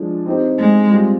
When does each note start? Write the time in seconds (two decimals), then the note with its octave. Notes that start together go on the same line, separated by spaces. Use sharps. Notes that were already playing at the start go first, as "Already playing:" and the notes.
Already playing: F3 G#3 D4
0.26 C4 D#4 G4 C5
0.59 G#3
0.91 G3 C4 F4